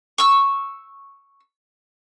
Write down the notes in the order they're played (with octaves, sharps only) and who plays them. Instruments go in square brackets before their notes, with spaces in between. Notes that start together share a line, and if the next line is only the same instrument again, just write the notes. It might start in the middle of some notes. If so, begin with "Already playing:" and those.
[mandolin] C#6 E6